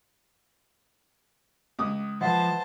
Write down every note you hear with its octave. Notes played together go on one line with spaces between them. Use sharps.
C#2 D6 D#6
E3 F3 B4 C5 E5 F#5 A5